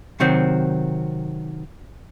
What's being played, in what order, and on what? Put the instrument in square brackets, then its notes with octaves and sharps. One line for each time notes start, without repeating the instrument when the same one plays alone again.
[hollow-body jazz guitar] C3 D#3 F#3 C4